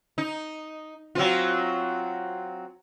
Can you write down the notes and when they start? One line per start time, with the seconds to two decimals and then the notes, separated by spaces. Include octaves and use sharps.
0.18 D#4
1.15 F#3 C4 F4